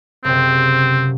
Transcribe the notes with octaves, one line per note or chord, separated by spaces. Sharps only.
F#1 C3 C4